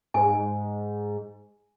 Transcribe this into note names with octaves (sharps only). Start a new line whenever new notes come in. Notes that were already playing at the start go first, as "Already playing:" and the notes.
G#2 G#5